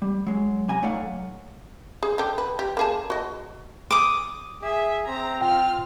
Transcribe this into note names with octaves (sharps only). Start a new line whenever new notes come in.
G3
F#3 G#3
C3 G#5 A#5
F#3 A3 D#4 D5 F5 F#5
G#4
D3 G5
B4
G4
A#3 G#4 A5
F#4 D#5
D6 D#6
G#4 E5
C4 A#5
F4 G5 F6